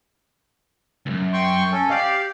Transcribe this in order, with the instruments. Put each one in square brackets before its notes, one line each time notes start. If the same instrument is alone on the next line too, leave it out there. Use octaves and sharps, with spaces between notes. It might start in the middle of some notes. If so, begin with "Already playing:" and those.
[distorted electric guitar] C#2 F#2
[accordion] G5 C6 C#6
C#4 A4
[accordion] G4 F5 [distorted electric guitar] D5 D#5